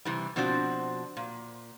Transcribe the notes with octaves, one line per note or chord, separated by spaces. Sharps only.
C3 E3 G3
B2 F3 C4 D4 F#4
A#2